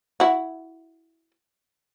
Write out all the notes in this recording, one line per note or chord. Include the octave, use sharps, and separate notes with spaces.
E4 F#4